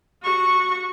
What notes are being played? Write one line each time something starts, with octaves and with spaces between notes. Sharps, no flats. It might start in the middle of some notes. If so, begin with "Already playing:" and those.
F#4 C#6